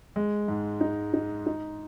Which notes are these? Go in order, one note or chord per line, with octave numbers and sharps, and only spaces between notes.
G#3
G#2
D#4
D#4
D#4